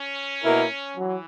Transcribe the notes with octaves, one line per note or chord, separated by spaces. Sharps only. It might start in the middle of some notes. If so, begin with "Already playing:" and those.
Already playing: C#4
B2 A#3 E4 A#4
E3 F#3